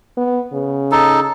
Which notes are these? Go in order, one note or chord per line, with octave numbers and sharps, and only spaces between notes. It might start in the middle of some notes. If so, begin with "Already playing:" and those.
B3
C#3
D#4 A4